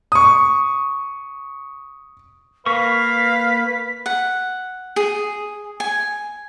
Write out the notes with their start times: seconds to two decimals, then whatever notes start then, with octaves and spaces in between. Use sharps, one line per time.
0.12 C#6 D#6
2.66 A#3 A#4 B4 F5 C#6 B6
4.06 F#5
4.96 G#4
5.80 G#5